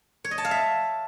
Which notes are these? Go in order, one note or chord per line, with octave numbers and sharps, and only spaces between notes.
C#5
D#5
A5
F5
E5